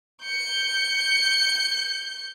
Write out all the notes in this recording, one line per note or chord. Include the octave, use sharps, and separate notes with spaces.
G6 C#7